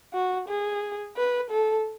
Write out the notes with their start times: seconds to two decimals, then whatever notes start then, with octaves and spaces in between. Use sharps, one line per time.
0.14 F#4
0.48 G#4
1.16 B4
1.51 A4